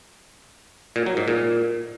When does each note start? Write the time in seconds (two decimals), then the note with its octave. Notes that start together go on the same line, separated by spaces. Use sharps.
0.96 A#2
1.06 F#3
1.17 G#2
1.28 A#2